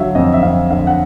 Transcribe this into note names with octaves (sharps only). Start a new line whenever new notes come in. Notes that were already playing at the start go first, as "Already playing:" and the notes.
Already playing: D3 F#3 E5 F5
F2 D#5
E5
F2 F5
D3 F5
F#5